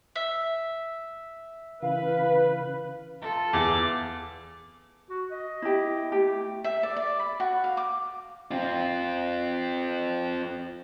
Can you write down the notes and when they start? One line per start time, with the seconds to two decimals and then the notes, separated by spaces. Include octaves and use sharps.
0.16 E5
1.83 C#3 E3 B4 F5
3.22 F4 A4
3.53 E2 D6
5.10 F#4
5.31 D#5
5.62 E4 G4
6.12 A3 G4
6.64 E5
6.83 D5
6.97 D5
7.20 B5
7.40 F#4
7.64 F5
7.77 D6
8.51 C4 F4